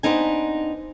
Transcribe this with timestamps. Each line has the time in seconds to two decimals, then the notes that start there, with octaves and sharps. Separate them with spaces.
0.03 B3 C4 D4 D#4 G#5